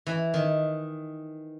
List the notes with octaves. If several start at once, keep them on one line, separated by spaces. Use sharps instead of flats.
E3
D#3